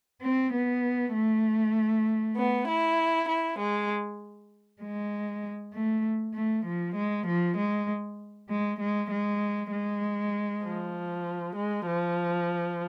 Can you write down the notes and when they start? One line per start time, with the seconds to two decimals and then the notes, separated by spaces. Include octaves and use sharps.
0.22 C4
0.52 B3
1.14 A3
2.36 B3
2.67 E4
3.28 E4
3.59 G#3
4.82 G#3
5.74 A3
6.35 A3
6.65 F3
6.96 G#3
7.27 F3
7.58 G#3
8.50 G#3
8.80 G#3
9.11 G#3
9.72 G#3
10.64 F3
11.56 G#3
11.86 F3